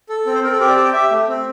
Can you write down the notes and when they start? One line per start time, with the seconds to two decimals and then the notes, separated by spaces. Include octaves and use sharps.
0.09 A4
0.26 C4
0.35 C5
0.43 C4 A#4
0.52 A4
0.60 G4 A#4
0.69 D5
0.76 G4 A5
0.85 G5
0.93 G4 E5
1.11 A3
1.28 C4